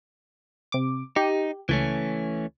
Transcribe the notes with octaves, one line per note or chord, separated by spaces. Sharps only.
C3 D6
D#4 G4
C#2 E3 A3 C#4